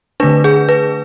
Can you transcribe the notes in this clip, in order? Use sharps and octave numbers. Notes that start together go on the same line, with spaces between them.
D3 A3 D4 B4
G#4
B4